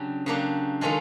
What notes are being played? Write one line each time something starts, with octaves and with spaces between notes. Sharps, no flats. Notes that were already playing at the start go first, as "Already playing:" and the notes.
Already playing: C#3 F#3 D4 G4
C#3 F#3 A#3 D4 G4
D#3 G#3 C#4 F4 A4